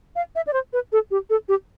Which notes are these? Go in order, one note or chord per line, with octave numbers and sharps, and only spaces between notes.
F5
E5
D5
C5
B4
A4
G4
A4
G4